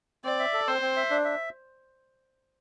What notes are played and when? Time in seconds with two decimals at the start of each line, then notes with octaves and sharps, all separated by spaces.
0.24 C4 D5
0.39 E5
0.53 A4
0.68 C4 C5
0.82 C4
0.96 E5
1.10 D4
1.25 E5